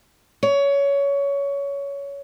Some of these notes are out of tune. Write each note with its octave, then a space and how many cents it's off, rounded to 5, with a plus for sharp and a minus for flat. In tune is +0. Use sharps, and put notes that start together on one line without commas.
C#5 +20